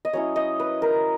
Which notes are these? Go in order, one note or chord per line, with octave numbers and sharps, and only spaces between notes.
D#5
F#3 C#4 E4 C#5
D#5
B4
A#4